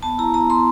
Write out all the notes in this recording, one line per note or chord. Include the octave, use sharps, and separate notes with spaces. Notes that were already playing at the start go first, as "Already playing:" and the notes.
B3 A5
E4 A#5
B3 A#5
B3 C6